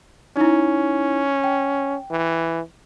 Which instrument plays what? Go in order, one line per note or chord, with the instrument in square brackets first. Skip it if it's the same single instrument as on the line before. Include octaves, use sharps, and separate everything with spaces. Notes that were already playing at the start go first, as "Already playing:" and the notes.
[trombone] C#4 [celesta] D#4 E4
[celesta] G5
[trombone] E3